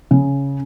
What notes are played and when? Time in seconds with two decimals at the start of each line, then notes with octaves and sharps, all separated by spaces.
0.11 C#3